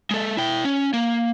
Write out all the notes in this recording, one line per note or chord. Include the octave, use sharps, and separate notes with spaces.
G#3 A4
E4 G5
C#4
A#3